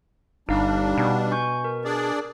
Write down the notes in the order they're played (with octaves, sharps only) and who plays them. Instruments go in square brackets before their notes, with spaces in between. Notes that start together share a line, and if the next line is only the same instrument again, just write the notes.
[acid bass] G1 [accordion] G3 D4 [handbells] D#4 F5
[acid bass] B2
[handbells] G#5 C#6 G6
A#4
[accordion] D4 G#4 D5